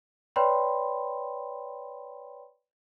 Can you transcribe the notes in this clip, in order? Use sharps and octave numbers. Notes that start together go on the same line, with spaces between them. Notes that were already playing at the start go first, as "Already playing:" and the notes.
B4 C#5 D5 G5 B5 C6